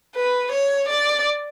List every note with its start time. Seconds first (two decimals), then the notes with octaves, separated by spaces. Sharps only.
0.15 B4
0.52 C#5
0.89 D5